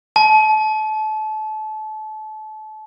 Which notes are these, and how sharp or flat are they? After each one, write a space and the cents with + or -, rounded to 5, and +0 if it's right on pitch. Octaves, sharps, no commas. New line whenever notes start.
A5 -30